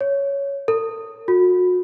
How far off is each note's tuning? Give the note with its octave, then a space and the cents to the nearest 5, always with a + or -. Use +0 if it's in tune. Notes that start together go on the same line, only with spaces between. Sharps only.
C#5 +5
A4 +40
F#4 -35